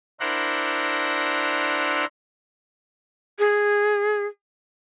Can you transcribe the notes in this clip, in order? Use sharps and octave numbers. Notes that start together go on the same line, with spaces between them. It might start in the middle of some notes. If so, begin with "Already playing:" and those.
D4 E4 A#4 C5 F#5 A#5
G#4